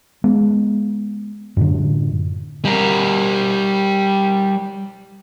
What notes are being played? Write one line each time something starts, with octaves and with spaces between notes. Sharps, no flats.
G#3 B3
F#2 A2 D3
G3 A#4